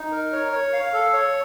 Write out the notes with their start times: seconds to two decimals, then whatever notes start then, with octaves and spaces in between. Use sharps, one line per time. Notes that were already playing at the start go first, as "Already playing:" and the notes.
Already playing: D#4
0.12 A#4
0.32 C#5
0.52 C#5
0.73 F5
0.93 A4
1.13 C#5